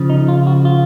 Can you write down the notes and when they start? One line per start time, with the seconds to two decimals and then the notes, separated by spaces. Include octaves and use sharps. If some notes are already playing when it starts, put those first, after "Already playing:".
Already playing: C#3 F3
0.10 D#4
0.28 F4
0.47 F#4
0.65 F4